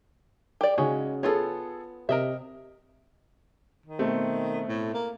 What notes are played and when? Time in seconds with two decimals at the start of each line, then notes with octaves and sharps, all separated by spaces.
0.61 G4 D5
0.78 C#3 G#3 C#4 D#4 F#4
1.23 B3 F4 G#4 A4 C#5
2.09 C3 A#4 D#5 E5
3.86 D#3
3.99 B2 A3 C4
4.68 A2
4.94 A#3